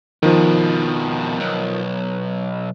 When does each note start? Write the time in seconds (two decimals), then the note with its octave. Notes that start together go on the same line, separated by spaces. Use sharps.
0.23 F2 B2 D#3 F3
1.40 B1